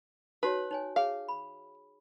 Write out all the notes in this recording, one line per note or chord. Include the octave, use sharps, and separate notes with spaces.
D#4 F#4 B4 C#5
D#4 C#5 G#5
G#4 C#5 E5 F5
B5